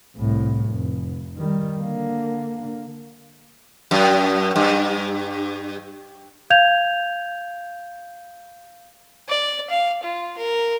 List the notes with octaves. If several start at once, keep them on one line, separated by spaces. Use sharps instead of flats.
C2 A2
F1
D#3 G3
D3 A#3
F#2
G2
F5 G6 G#6 F7
D5
F5
F4
A#4